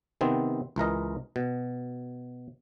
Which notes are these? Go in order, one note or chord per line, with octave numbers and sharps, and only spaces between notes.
C3 D#3 B3 C4
C#2 E3 A#4 D#5
B2